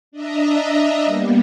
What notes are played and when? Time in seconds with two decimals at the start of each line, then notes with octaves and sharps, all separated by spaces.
0.12 D4 D#5 E5 A#5
1.05 G3 A#3 B3